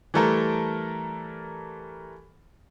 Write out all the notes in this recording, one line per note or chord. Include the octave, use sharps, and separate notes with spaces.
E3 G3 A3 A4 A#4